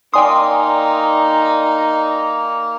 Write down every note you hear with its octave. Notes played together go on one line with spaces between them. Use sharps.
A#3 D#4 D5 G5 G#5 C6 D#6